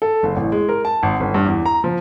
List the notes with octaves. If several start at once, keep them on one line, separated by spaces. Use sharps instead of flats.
A4
F#1
A1
G#3
A#4
A5
G#1
G1
G2
E2
A#5
F3